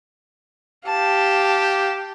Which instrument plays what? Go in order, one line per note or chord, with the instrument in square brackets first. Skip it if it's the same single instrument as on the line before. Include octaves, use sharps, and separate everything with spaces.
[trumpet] G4 [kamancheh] F5 A5